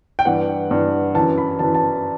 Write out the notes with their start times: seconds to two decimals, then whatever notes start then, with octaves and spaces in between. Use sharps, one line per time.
0.19 G5
0.25 G2 E3 F#5
0.71 G2 E3
1.15 E3 A5
1.20 F#2
1.38 B5
1.59 F#2 E3 A5
1.75 A5